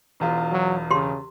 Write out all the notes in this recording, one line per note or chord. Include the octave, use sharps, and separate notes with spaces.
E1 E2 F4
F#3
C#3 G4 C6